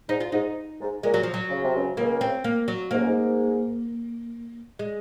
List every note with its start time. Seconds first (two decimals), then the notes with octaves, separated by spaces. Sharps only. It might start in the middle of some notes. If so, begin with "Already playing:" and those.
0.09 G#2 D#4
0.20 F4
0.32 G#2 D#4
0.80 G#2
1.03 A#2 G#3
1.14 F#3
1.23 F3
1.34 F#3
1.50 C#3
1.63 C3
1.75 C#2 C#3
1.97 C#2 C#3 A#3
2.21 C4
2.44 A#3
2.68 F#3
2.91 G#2 A#3
2.99 F#2
3.07 G#2
4.79 G#3